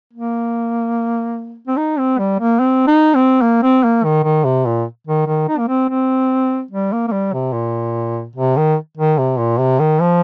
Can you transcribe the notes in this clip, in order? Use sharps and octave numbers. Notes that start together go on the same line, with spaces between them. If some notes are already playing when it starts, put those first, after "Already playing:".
A#3
C4
D#4
C4
G3
A#3
C4
D#4
C4
A#3
C4
A#3
D#3
D#3
C3
A#2
D#3
D#3
D#4
A#3
C4
C4
G3
A#3
A#3
G3
C3
A#2
C3
D#3
D#3
C3
A#2
C3
D#3
F3